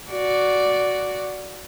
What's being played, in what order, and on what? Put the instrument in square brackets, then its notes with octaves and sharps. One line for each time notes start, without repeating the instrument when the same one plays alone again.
[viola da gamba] F#4 D5